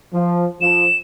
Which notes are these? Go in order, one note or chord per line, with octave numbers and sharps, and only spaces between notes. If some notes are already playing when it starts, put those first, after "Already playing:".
F3
F3 E7